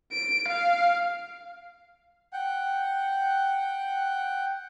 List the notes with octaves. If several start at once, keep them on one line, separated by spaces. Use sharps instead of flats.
D7
F5
F#5 G5